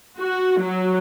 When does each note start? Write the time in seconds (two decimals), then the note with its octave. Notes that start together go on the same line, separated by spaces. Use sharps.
0.18 F#4
0.62 F#3